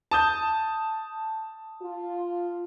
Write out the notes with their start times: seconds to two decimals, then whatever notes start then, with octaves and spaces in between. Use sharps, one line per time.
0.11 A5 D#6 G6
1.81 F4